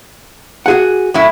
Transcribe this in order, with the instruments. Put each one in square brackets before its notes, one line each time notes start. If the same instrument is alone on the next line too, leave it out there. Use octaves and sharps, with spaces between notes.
[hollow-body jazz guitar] F#4 G#4 F#5
[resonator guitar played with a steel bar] A2 F#3 E4